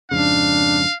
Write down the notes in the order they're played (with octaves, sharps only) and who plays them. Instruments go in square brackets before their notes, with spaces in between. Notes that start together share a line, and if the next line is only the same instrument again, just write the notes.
[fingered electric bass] F2 G#2 C#3 [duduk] D4 [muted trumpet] F5